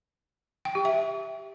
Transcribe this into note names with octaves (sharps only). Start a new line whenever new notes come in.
G5
G4
E5